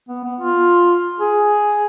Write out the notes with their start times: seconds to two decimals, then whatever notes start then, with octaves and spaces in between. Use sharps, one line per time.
0.09 B3
0.24 B3
0.40 F4
1.20 G#4